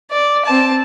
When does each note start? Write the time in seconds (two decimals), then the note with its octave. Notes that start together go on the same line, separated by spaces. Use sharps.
0.11 D5
0.46 C4 A5